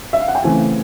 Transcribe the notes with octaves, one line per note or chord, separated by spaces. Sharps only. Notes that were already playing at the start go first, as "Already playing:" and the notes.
E5
F5
F#5
G5
C#3 E3 A3 C4 G#5